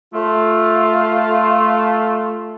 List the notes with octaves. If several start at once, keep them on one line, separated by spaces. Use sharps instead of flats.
A3 F4